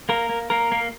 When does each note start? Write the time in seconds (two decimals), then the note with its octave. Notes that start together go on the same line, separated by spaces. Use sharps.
0.09 A#3 A#4
0.29 A#3
0.50 A#3 A#4
0.72 A#3